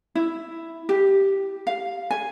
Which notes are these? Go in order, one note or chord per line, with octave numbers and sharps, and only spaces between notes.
E4
G4
F5
G#5